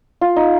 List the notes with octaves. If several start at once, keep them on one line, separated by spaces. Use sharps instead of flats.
F4
D#4